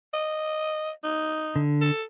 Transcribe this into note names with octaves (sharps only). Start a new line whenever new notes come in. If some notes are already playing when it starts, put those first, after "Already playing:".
D#5
D#4
D3
A4